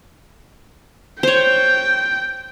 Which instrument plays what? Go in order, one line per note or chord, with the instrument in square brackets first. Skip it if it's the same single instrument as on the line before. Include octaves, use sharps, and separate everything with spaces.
[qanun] C5 C#5 [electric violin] G5